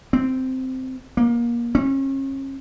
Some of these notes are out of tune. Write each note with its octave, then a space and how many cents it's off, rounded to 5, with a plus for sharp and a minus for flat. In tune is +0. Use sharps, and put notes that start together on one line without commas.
C4 -10
A#3 +25
C#4 -35